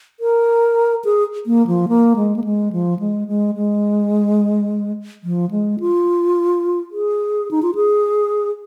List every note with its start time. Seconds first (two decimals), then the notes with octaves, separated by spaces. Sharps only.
0.20 A#4
1.05 G#4
1.46 A#3
1.67 F3
1.88 A#3
2.16 G#3
2.36 A#3
2.44 G#3
2.72 F3
2.99 G#3
3.28 G#3
3.55 G#3
5.24 F3
5.51 G#3
5.80 F4
6.91 G#4
7.51 D#4
7.63 F4
7.75 G#4